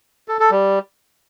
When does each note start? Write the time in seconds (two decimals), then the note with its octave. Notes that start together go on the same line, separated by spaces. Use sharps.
0.28 A4
0.40 A4
0.51 G3